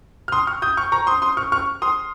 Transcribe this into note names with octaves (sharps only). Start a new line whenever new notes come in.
F6
C6 D#6
C#6 F6
D#6 G6
C#6 F6
A#5 C#6
C6 D#6
C6 D#6
C#6 F6
C#6 F6
C6 D#6